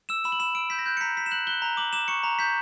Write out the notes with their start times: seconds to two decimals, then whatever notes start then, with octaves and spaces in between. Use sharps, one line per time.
0.09 E6 E7
0.24 B5 E7
0.32 F#7
0.40 B5 E7
0.55 E6 D7
0.70 G6 B6
0.79 A#6
0.86 F#6 G6
0.97 C#7
1.01 A#5 B6
1.16 A#5 B6
1.26 E7
1.31 F#6 F#7
1.47 F#6 G7
1.62 A#5
1.77 D6 F#7
1.93 D6 E7
2.08 C#6 C#7
2.23 A#5
2.39 G6 B6